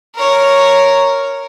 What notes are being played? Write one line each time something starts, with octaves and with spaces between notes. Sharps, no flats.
A#4 C#5